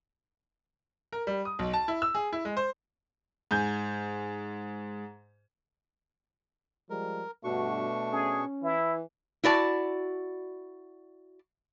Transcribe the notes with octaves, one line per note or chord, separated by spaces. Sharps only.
A#4
G3
D#6
B1
A5
E4
E6
G#4
E4
G#3
C5
G#2 G#5 G6
F3 G3 G#3 A#4
G2 B2 A3 D4 F#4 C#6
C#4 G#4
E3 E4
E4 F#4 D5 A5